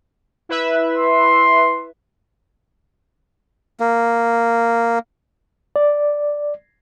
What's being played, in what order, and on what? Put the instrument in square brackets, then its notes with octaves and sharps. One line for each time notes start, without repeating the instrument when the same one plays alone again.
[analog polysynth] E4 B4 E5
[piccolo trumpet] C6
[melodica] A#3
[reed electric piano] D5